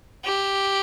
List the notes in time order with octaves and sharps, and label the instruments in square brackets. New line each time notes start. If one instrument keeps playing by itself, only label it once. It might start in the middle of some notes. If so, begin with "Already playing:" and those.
[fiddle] G4